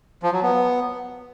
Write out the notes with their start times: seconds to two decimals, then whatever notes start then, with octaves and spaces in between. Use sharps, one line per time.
0.23 F3
0.33 F#3
0.43 B3